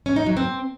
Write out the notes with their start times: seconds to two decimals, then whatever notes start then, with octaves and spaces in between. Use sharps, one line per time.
0.06 C#4
0.16 D#4
0.26 F#3
0.37 C4